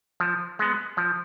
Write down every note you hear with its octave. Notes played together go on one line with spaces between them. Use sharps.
F3
G#3 B3
F3